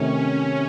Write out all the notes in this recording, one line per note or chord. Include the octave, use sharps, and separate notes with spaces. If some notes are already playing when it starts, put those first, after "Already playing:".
Already playing: C3 D#3 A3 C#4